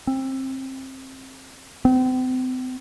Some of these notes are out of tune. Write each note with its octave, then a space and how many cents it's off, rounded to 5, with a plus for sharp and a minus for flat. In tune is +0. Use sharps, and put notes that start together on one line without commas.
C4 +25
C4 -40